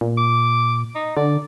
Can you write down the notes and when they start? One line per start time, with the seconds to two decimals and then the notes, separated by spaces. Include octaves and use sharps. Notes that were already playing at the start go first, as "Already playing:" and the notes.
0.01 A#2
0.18 D6
0.95 D#4
1.17 D3 D5